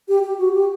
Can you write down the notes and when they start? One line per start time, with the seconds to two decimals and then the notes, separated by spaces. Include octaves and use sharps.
0.09 G4
0.23 G4
0.38 F#4
0.54 G4